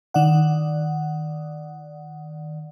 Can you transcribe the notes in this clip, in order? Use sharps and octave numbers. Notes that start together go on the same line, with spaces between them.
D#3 D5 F#5